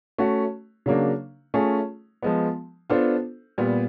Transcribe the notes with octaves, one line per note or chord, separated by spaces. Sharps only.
A3 C#4 F#4
C#3 F#3 A#3 D4
A3 C#4 F4 G#4
F3 G#3 B3
B3 D4 F4 A4 C5
A#2 G3 B3